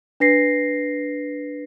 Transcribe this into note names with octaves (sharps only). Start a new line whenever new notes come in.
D4 B4 A#6 C7